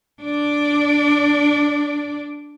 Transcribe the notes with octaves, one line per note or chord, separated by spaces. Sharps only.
D4 D5